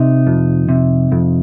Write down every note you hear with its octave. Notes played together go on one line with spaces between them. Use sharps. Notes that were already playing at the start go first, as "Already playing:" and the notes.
Already playing: C3 D#4
F2
C3
F2